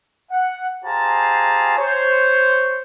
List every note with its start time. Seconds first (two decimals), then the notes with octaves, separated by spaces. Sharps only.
0.31 F#5
0.85 F4 G4 G#4 C5 A5 A#5
1.77 C5 C#5